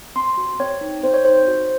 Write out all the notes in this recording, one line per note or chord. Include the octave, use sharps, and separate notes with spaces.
C4 C6
F#4
C4 C#5
D#4
C4 C5
C#5
D#4 C5
F#4